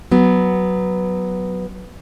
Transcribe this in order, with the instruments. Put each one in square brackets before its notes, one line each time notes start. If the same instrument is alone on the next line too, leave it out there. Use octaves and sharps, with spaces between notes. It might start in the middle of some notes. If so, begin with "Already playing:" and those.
[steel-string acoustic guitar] F#3 B3